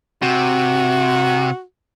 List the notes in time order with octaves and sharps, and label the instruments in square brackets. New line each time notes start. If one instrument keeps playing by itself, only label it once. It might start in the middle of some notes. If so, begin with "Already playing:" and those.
[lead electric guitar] C3 [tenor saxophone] F#4